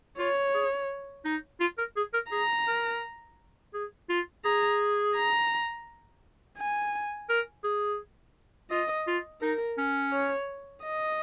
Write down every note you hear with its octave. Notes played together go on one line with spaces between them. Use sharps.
F4 C#5
G#4
D#4
F4
A#4
G#4
A#4
G#4 A#5
A#4
G#4
F4
G#4 A#5
A#5
G#5
A#4
G#4
F4 D#5
F4
D#4 A#4
C#4
C#5
D#5